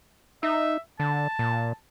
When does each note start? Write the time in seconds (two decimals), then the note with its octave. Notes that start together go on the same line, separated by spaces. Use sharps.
0.43 D#4 E5
1.00 D3 A5
1.39 A#2